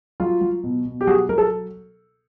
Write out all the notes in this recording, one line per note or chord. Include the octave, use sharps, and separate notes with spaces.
F#3 F4
F#3
B2
B2
G4
F#3 F#4 G#4
F#3 A#4
A4